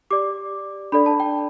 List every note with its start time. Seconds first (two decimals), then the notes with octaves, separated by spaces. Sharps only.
0.11 G4 D5 D6
0.92 D4 A4 D5 B5
1.06 A5
1.20 G5